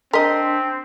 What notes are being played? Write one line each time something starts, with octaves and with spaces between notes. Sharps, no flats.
C4 D4 A#4 D#5 C6 B6